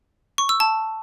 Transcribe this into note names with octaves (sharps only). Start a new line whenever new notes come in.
C#6
E6
A5